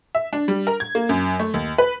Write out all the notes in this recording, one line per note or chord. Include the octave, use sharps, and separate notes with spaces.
E5
D4
G3
A#4
G#6
A#3
F#2
A3
D#2
B4